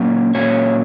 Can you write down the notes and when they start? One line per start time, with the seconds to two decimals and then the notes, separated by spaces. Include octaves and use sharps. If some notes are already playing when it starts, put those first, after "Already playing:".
Already playing: A#2 F#3 A#3 C#4
0.35 A#2 F#3 A#3 C#4 C#5